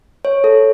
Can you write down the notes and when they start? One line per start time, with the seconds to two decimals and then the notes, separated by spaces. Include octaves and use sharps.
0.25 C#5
0.44 A4